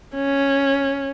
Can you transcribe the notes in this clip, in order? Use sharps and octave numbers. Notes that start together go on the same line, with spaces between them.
C#4